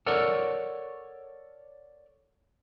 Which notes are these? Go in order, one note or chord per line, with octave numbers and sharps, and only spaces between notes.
A4 A#4 C#5 D5 F#5